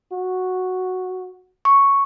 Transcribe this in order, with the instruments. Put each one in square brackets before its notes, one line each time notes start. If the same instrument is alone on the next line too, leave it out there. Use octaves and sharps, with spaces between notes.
[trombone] F#4
[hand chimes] C#6